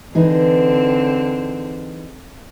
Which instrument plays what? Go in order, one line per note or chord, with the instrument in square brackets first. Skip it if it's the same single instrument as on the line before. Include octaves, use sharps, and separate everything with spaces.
[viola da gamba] D3 C4 [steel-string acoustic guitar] E3 D#4 G#4